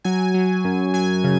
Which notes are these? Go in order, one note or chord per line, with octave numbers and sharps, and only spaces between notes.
F#3 G#5
F#3
F#2
F#3 G#5
C#3